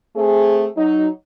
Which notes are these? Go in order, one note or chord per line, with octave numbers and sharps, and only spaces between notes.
A3 C4 G#4
F#3 D#4